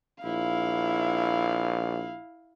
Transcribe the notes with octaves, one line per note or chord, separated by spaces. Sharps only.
A#1 E4 F5